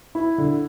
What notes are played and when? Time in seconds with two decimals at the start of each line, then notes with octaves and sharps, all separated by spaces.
0.15 E4
0.38 D3